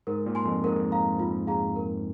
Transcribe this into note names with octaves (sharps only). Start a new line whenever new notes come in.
G#2 A#4
A#2
G#5 C6
F2
G#2 A#4
F5 A#5
F4
G#4 F5 A#5
A#4